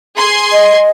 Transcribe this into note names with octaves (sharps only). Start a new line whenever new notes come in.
G#4 C6 G#6
D#5